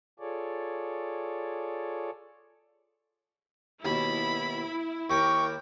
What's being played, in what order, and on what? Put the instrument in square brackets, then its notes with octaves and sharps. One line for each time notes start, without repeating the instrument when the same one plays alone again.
[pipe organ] F4 G#4 A4 C#5 D5
[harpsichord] D#2 B2 [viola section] E4 [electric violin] B5
[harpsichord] D#2 D6 [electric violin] A#4 G5 [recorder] C#6